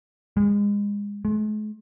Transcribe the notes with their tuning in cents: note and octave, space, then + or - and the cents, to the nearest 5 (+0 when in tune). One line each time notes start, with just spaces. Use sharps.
G#3 -30
G#3 +45